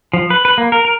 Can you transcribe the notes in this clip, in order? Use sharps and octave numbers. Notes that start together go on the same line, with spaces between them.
F3
B4
B4
A#3
A#4
A#4